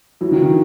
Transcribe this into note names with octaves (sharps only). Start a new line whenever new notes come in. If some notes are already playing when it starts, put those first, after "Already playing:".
E3 F#3
D#3 F3
D#3